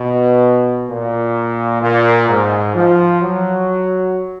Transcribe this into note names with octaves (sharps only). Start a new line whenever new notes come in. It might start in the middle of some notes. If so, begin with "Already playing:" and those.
Already playing: B2
A#2
A#2
G#2
F3
F#3